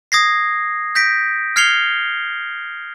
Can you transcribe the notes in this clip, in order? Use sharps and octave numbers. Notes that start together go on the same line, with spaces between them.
D#6 G#6 A#6 C7
G6 A#6 B6 D7
F6 G#6 C7 C#7 F7 G7